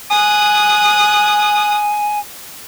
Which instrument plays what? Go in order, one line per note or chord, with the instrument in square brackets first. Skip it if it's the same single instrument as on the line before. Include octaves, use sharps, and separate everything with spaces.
[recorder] G#5 [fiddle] D#6 F#6